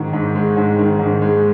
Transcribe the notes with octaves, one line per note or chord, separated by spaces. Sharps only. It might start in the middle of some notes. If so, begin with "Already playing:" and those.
Already playing: G#2 D#3
G#2
G#3
G#2
D#3
G#2
G#3